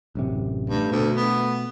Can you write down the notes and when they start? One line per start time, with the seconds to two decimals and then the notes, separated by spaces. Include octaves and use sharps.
0.15 A1 F#2 C3
0.69 G2 A3
0.92 D2 B2
1.16 B3